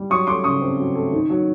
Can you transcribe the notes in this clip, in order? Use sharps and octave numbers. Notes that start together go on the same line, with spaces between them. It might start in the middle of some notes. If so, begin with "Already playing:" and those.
Already playing: G3
F#3 C#6 D#6
A3 C6 D6
C#3 C#6 D#6
C4
F#3
A3
D#3
F#3